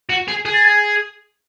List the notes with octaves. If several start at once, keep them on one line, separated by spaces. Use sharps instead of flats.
F#4
G#4
G#4
A6
G#6